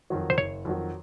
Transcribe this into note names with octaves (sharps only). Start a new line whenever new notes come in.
F2 D#3 F#3
C5
F#1 C#5
F2 D#3 F#3